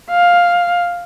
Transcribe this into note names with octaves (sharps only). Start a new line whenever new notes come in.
F5